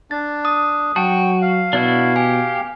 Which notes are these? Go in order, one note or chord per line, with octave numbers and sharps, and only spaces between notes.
D4 A6
D#6
F#3 F#4 G5 A5
F5
B2 D4 E4 F#4
G4 G#5